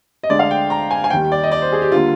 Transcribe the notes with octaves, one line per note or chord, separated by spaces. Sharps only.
D#5
D2 D3 G#3 D4 D5
F5
G5
A#5
G#5
G#5
D#2 D#3 G3 G5
D5
D#5
D5
C5
G#4
G4
D3 G3 A#3 F4